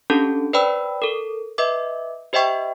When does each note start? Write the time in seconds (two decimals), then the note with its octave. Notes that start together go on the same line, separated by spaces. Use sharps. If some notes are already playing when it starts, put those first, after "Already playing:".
0.10 C#4 D4 G4 A4 A5
0.53 B4 C5 D5 G5 B5 E6
1.02 A4 A#4
1.58 B4 D#5 E5 D6
2.33 G4 C5 D#5 E5 G5 C#6